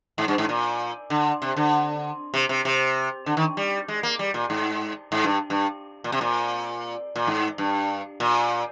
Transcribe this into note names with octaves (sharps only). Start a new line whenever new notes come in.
G#2
G2
G#2
A#2
D3
C3
D3
C3
C3
C3
D3
D#3
G3
G#3
A#3
G3
A#2
G#2
G#2
G2
G2
A#2
C3
A#2
A#2
G#2
G2
A#2